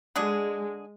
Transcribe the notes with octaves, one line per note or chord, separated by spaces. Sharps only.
D3 G#3 D4 G#4